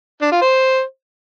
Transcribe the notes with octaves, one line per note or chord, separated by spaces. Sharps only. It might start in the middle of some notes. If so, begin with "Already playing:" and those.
D4
F4
C5